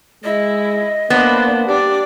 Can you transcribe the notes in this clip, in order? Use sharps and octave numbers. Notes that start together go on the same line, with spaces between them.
G#3 E4 D#5
A#3 B3 D4 C5
D4 G4 D5